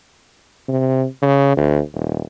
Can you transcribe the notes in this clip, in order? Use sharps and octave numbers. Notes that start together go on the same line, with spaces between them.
C3
C#3
D2
D#1